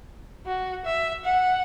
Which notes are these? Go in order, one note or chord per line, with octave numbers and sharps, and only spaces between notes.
F#4
E5
F#5